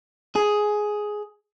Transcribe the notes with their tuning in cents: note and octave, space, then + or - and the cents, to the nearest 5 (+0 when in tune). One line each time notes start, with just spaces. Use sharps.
G#4 +10